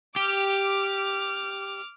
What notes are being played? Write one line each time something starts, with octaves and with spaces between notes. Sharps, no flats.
G4 D6 F6